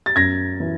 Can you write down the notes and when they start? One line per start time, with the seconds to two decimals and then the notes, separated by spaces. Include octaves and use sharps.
0.06 A6
0.16 F#2 G#6 A#6
0.60 E3